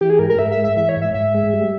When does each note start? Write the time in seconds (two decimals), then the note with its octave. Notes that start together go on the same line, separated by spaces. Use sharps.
0.01 E3 G4
0.10 G#4
0.19 G#2 A#4
0.30 A#4
0.39 G#2 E5
0.52 E5
0.57 G#3
0.64 E5
0.77 E3 E5
0.89 C#5
0.96 G#2
1.02 E5
1.14 G#2 E5
1.35 G#3
1.53 G3